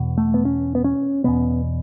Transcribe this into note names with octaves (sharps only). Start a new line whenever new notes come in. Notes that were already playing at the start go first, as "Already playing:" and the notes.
Already playing: E2 B2
A3
B3
C#4
B3
C#4
E2 B2 B3